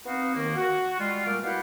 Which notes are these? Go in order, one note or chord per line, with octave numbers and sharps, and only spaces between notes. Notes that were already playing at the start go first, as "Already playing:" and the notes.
B3 C4 D#4 F#4 F5
D#2 D#3 A#3
F#4
G3 G#3 F4
A#2 G3 A3 D6 F6
B2 E4 G4 F5 F#5